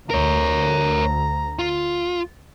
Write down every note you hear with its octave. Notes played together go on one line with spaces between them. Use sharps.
D2 A#4 C#5 A#5
F4